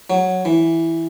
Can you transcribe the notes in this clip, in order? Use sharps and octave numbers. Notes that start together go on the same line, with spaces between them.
F#3
E3